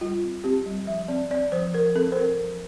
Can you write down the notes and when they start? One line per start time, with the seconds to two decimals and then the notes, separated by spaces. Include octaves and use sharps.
0.01 G3 F4
0.23 C4
0.44 C4 G4
0.66 G3
0.87 F3 E5
1.08 C4 D5
1.30 C4 D5
1.52 F3 C5
1.74 F3 A#4
1.95 C4 A4
2.12 C5
2.17 C4 A#4
2.38 F3